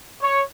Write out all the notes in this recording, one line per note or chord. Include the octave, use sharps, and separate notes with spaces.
C#5